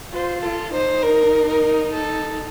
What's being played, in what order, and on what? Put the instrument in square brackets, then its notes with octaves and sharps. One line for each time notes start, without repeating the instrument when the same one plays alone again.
[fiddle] F4 [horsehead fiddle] C5
[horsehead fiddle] F4 [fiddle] A4
[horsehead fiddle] D#4 [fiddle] C5
[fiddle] A#4
A#4
A4